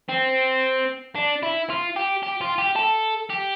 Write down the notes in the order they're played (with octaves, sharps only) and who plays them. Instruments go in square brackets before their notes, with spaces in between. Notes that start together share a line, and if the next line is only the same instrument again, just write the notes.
[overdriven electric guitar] C4
D4
E4
F4
G4
G4
F4
G4
A4
G4